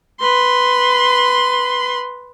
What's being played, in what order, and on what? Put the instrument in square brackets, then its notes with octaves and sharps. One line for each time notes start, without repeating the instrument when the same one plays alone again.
[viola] B4 C6